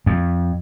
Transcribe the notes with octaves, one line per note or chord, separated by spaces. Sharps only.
F2